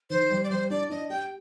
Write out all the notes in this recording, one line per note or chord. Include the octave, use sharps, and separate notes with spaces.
D#3 C5
G3
D5
G3 C5
D4 D5
D4 D#5
G4 G5